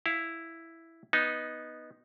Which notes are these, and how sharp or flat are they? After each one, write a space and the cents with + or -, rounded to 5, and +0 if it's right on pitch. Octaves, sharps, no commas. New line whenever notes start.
E4 +0 F5 +0
B3 -5 D#4 +0